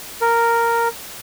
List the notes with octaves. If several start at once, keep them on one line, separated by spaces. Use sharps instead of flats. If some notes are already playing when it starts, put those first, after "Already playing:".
A#4